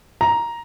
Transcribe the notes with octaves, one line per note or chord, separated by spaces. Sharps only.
A#5